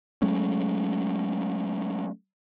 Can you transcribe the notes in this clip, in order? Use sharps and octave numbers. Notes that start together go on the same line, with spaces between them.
F#3 G#3 A3 C#4